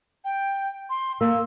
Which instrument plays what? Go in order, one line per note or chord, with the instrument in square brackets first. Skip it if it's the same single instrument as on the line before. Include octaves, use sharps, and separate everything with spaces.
[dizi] G5
C6
[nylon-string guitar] A#3 [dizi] E6